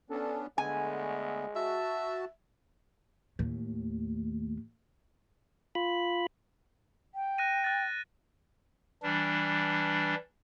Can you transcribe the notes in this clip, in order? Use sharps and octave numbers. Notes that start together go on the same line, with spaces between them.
B3 C#4 D4 A4
D3 G#3 A3 B3 G#5
F#4 E5 A5
D#2 A2
F4 B5
G5
F#6 A#6 D#7
F#6 A6
E3 G3 D4